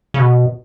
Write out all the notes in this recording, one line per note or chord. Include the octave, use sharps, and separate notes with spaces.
C#3
B2